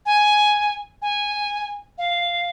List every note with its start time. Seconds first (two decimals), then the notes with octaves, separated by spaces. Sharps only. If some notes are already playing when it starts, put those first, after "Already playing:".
0.06 G#5
1.02 G#5
1.98 F5